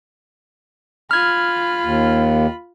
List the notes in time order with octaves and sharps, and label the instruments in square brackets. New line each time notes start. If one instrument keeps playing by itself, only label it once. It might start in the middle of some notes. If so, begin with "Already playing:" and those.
[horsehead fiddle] F4 B5 [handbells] F6 G#6
[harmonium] D#2